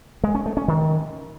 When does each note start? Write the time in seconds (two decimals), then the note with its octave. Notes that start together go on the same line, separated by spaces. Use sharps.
0.24 G#3
0.35 C#4
0.46 A3
0.57 C#4
0.68 D#3